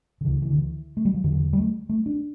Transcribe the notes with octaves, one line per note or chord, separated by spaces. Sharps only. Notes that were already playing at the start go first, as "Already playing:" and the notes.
D3
D2 C#3 E3
E3
D3
E3
A3
G3
F3
E2 D3 E3
F3
E3
G3
A3
A3
D4